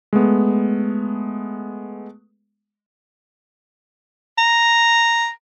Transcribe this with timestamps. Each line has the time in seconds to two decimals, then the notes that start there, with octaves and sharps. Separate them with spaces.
0.13 G#3 A3 B3
4.38 A#5